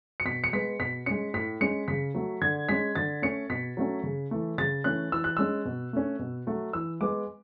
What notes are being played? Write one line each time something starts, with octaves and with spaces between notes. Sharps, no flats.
C#7
B2 B6
C#7
G#3 B3 B6
B2 B6
G#3 C#4 C#7
A2 B6
G#3 C#4 C#7
C#3 B6
F#3 A3
D3 G#6
G#3 C#4 B6
D3 A6
A3 C#4 C#7
B2 B6
F#3 A3 C#4
C#3
E3 A3
C#3 A6
E3 A3 C#4 F#6
E3 E6
F#6
G#3 C#4 E6
B2
A3 C#4
B2
F#3 A3
E3 E6
G#3 B3 D6